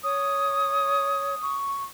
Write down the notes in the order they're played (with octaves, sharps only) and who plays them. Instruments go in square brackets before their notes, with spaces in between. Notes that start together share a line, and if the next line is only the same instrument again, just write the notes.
[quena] C#5 [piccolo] D#6
[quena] C#6